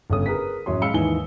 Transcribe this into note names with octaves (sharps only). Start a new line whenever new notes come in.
G1 C#3 C#4 A4 D#6
G#4 A#4 B4 B6
A1 F#2 F#3 C#5 C6
G#3 F5 B5 E6 C#7 G7
D#2 G#2 E3 G#5 G7